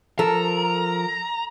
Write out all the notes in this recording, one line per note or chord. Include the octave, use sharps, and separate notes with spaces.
F3 A4 A#4 A#5